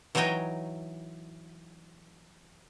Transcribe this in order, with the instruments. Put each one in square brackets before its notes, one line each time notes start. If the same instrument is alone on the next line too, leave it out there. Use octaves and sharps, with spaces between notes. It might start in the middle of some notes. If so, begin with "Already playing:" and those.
[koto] E3 F#3 D#4 C#5 D#5 G5